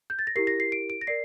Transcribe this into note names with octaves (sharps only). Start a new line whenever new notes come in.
G6
A6
A#6
E4 G4 A#4 C7
A#6
C7
D7
D7
A#6
A#4 D5 C7